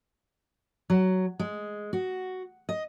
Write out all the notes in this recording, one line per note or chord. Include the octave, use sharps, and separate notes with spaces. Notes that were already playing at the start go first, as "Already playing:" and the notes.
F#3
G#3
F#4
D#5